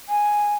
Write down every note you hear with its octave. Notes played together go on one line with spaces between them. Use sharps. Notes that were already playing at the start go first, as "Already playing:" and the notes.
G#5